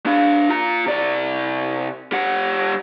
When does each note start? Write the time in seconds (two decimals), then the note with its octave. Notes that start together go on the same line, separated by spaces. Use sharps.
0.06 D4 F5
0.49 F4 A#5
0.86 C3 D5
2.12 G3 F#5